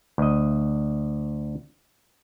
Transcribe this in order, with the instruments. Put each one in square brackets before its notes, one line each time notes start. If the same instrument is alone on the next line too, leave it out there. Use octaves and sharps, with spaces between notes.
[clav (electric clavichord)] D2 D#5